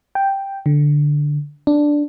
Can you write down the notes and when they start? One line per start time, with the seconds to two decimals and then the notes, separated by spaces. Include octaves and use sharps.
0.15 G5
0.66 D3
1.67 D4